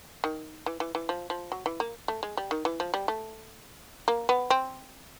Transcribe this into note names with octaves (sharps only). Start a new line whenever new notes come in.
D#3
E3
E3
E3
F3
F3
F#3
E3
A#3
A3
G#3
G3
D#3
E3
F3
G3
A3
A#3
B3
C4